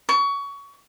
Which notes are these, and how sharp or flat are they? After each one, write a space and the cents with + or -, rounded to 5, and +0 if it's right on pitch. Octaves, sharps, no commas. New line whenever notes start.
C#6 +25